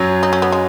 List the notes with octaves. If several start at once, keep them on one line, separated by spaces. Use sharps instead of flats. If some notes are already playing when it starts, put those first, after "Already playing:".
Already playing: F#2 F#3
D#4
C#4
B3
G#3